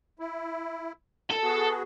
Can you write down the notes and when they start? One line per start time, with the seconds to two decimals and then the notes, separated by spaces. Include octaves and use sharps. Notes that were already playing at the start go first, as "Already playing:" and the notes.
0.19 E4
1.31 A#2 A4
1.43 B3 F#4 G#4